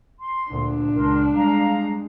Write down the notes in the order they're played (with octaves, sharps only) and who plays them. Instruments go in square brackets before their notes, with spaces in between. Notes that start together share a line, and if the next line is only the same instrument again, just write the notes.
[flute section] C6
[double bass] D2 A#2 [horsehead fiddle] D4
[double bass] C#2 [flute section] A#4 C6
[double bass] G3 G#3 [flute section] F5 A#5